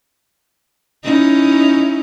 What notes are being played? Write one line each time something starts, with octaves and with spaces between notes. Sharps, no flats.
C#4 D#4 E4